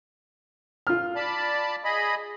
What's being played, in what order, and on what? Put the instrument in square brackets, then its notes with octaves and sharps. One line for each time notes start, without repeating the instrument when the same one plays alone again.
[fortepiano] F4 F6
[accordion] D5 A5 B5
G#4 D#5 B5